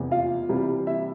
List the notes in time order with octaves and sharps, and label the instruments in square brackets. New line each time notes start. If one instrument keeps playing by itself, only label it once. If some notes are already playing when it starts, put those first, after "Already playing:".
Already playing: [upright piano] F1 E2 C3
F4 F5
C2 C3 E3 G3
E4 E5